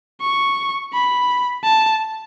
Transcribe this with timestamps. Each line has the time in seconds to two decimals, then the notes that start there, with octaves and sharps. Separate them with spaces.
0.21 C#6
0.93 B5
1.64 A5